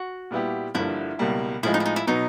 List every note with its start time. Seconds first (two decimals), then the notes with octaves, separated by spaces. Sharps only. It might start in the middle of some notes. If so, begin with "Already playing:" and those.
Already playing: F#4
0.31 A#2 G3 B3 E4 G4
0.75 G1 G2 D3 F3 A#3 E4
1.19 C#2 B2 G3 A#3
1.63 A2 F3 G#3 E4
1.74 D#4
1.80 E4
1.86 D#4
1.96 E4
2.07 B2 F#3 B3 D#4